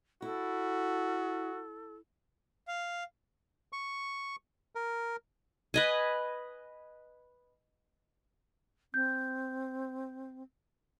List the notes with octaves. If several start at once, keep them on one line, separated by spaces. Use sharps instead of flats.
E4 F#4 A4
F5
C#6
A#4
B4 D#5 G#5
C4 G6